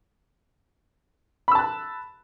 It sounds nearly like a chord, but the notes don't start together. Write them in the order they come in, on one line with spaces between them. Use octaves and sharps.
B5 E6 A5 F#6